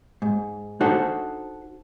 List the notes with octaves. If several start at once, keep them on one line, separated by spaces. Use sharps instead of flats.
G#2
D4 D#4 F#4 A4 C5 F#5